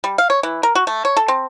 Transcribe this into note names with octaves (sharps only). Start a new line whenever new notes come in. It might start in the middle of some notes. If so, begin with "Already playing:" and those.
G3
F5
C#5
E3
A#4
F#4
A3
C#5
A4
C4